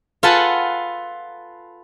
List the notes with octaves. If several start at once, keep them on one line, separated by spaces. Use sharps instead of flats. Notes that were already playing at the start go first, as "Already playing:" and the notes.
F4 A4 B4 F#5 G#5 A5